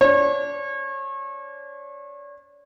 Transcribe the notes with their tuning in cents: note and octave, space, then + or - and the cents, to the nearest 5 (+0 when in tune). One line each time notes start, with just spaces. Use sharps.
D4 -35 C#5 -35